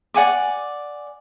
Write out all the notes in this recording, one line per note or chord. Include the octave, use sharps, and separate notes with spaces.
D5 F#5 G#5 D6